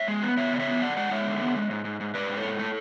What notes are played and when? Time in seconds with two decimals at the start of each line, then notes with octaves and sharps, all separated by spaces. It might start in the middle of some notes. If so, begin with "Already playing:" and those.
Already playing: C#5 E5
0.08 G#3
0.23 B3
0.37 B3 C#5 E5
0.52 C#3 D5
0.59 C#5 E5
0.68 B3
0.81 F#2 D5 F#5
0.97 G#3 D5 F#5
1.11 G#3 C#5 E5
1.26 D3
1.41 B3
1.56 G#3
1.71 G#2
1.85 G#2
2.00 G#2
2.14 G#2 B4 D5
2.30 G#2
2.37 A4 C#5
2.45 G#2
2.59 A3